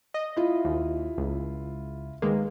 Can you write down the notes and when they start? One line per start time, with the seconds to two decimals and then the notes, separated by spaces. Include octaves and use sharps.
0.14 D#5
0.36 E4 F4
0.65 D#2
1.18 C#2
2.22 D#3 G#3 A#3 B4